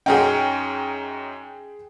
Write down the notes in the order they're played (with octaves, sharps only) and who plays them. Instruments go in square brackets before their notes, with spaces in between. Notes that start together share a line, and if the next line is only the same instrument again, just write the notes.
[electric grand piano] F#2 C#4 D#4 [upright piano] G#4 G5